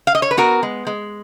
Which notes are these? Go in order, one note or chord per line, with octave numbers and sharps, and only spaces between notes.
F5
D#5
C#5
B4
B3 F#4 A#4
G#3
G#3